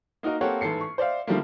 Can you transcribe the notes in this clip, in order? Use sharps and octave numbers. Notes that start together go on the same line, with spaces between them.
A#3 D#4 F#4 A#4 D#5
A#3 C4 G4 A4 C#5 F#5
A1 G#2 A4 C7 C#7
C#6
C5 D5 E5 F5
D3 D#3 F3 G3 A3 A#3